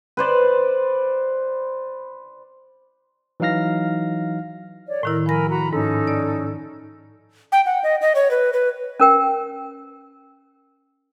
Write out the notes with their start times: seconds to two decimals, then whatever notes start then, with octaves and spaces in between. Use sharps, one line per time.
0.17 B4 C5 D5
3.40 E3 F#3 D#4 F5 F6 A#6
4.87 C#5 D5
5.03 A2 D#3 E4 A#4
5.26 F3 A#4 G#5 B5 A#6
5.49 F#4 A#5 B5
5.73 G#2 C#4 D#4 A4
6.07 D5
7.52 G5
7.66 F#5
7.83 D#5
8.01 D#5
8.15 C#5
8.31 B4
8.53 B4
9.00 C#4 A#4 G5